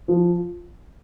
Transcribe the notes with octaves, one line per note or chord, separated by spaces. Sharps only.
F3